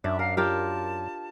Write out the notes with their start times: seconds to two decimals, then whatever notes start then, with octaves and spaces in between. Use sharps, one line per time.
0.04 F#2 D4 E5
0.19 A#4 F5
0.37 F4 G4 A#4 A5